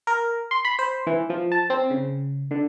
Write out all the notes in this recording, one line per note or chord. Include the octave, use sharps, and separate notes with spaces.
A#4
C6
B5
C5
E3
F3
A5
C4
C#3
D3